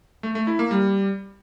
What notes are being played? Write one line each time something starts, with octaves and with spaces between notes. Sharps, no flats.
A3
A3
E4
A#3
G3